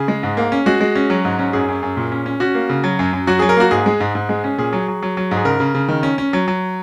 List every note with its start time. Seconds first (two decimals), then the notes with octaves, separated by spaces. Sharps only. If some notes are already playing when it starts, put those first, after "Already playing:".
Already playing: C#3 G#4
0.08 G#3
0.23 G#2
0.37 A#3
0.52 C#4
0.66 G#3 F#4
0.81 G#3
0.95 C#4
1.10 F#3
1.25 G#2
1.39 C#4
1.53 F#2 G#4
1.68 F#2
1.83 F#2
1.97 A#2
2.12 C#4
2.26 C#4
2.40 C#4 F#4
2.55 A#3
2.69 C#3
2.84 F#3
2.99 F#2
3.13 F#2
3.27 F#3 F#4
3.39 F#3 G#4
3.49 A#4
3.57 A#3 F#4
3.71 G#2 G#4
3.86 G#3
4.00 G#2
4.15 G#2
4.29 G#3
4.44 C#4
4.58 A#2 G#4
4.73 F#3
4.88 F#3
5.02 F#3
5.17 F#3
5.31 G#2
5.37 G#4
5.45 C#3 A#4
5.60 C#3
5.75 C#3
5.88 D#3
6.03 C#4
6.18 C#4
6.33 F#3
6.48 F#3